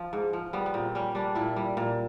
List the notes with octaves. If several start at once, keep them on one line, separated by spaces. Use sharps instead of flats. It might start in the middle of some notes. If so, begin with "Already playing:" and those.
Already playing: F3
G#2
F3
G3 B3
B3
A#2 C4
G3 C#4
G3 D4
A#2 E4
G3
A#2